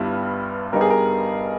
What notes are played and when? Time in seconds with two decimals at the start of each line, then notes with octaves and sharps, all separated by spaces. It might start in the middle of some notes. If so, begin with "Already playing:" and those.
Already playing: G1 G2 G3 B3 E4
0.72 G2 G3 B3 D#4 A#4
0.81 G#4
0.90 A#4